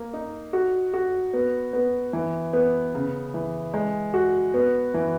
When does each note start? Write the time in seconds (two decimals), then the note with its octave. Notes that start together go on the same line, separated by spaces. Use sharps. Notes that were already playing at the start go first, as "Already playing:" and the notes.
Already playing: A#3
0.14 D#4
0.53 F#4
0.94 F#4
1.33 B3
1.73 B3
2.13 E3
2.53 B3
2.94 C#3
3.34 E3
3.74 G#3
4.14 F#4
4.54 B3
4.94 E3